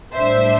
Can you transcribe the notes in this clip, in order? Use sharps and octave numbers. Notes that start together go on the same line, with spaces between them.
A2 G3 D4 C5 E5